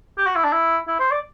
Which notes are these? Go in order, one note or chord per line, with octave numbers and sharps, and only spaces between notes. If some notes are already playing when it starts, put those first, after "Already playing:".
G4
F#4
E4
D4
E4
E4
C5
D5